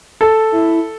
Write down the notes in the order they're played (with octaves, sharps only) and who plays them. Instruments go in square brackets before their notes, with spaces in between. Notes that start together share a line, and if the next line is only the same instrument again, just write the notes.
[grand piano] A4
[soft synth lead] E4